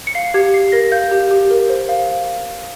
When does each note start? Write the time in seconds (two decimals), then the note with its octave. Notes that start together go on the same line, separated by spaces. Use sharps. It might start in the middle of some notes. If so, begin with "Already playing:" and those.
0.07 C#7
0.15 F5 C7
0.34 G4 G#6
0.54 G4 C7
0.72 A#4 A#6
0.92 F5 G6
1.11 G4
1.31 G4
1.51 A#4
1.69 C5
1.89 F5